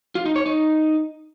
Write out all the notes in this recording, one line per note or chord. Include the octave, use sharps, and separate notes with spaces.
F4
D#4
C#5
D#4